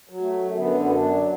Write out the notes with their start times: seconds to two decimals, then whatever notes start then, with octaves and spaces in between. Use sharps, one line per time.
0.09 F#3
0.21 A3
0.33 F#2
0.55 D3 B3
0.79 F#2 B3
0.91 D4
1.03 F#3